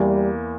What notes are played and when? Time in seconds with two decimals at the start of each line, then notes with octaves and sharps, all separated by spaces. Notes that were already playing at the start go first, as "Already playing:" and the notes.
Already playing: E2 E3 G3 A#3